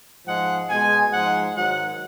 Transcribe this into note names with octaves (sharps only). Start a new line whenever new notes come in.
G#2 F3 G#3 F#5
B2 G#3 G#5
G#2 F3 G#3 F#5
G#2 D#3 F#3 F#5